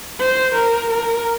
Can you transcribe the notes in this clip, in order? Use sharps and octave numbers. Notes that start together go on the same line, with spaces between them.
C5
A#4
A#4